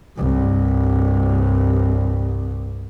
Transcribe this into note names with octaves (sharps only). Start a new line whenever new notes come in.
C2 G2